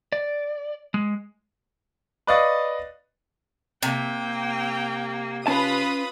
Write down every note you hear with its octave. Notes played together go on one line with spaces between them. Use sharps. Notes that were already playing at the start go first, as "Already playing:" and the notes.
D5
G#3
B4 D5 D#5 F5 C#6 A6
C3 A#3 G5
C#4 F4 B4 A5 B5 D#6